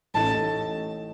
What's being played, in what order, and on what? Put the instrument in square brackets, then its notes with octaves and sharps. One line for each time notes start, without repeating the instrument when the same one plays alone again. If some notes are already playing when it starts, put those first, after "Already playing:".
[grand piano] A1 A2 A3 D#4 [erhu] A5